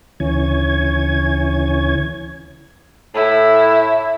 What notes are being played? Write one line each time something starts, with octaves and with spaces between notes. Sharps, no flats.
D2 C#3 E3 C#5 G#5 G#6
A2 E4